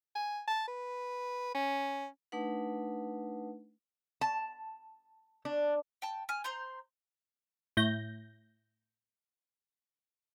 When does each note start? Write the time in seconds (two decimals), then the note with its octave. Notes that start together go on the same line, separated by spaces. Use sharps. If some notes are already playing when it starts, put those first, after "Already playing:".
0.15 G#5
0.48 A5
0.68 B4
1.55 C#4
2.32 A3 D4 D#4 B4 F#5
4.21 A5
5.45 D4
6.02 G5 A5
6.29 G#5 F6
6.44 C5 A#5 C6 G6
7.77 A2 G6 A#6